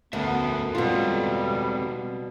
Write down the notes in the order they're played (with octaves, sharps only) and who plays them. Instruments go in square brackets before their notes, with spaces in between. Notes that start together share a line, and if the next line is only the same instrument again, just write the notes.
[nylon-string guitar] D2 [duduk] B3 [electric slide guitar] C#4 A#4 E5
[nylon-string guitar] B2 F4 [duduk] G3 [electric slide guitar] G#3 C4 A4